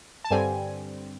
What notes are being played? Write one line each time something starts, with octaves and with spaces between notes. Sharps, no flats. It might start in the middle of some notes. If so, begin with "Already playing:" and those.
A5
G2 D3 G3 C4 G#5